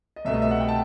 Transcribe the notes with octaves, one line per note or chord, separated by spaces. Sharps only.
D#5
C2 B2 A3 E5
D#5
E5
F#5
G5
A5